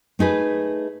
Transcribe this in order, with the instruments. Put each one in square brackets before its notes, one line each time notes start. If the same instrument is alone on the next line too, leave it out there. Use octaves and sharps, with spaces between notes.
[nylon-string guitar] A3 D#4 G#4 B4